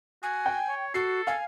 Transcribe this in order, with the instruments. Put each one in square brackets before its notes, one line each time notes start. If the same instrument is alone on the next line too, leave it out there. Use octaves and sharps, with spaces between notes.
[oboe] F#4 [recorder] G#5
[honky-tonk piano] G5
[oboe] C#5
[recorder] F#4 [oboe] A4 [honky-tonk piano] C7
[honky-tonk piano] F5 [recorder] G#5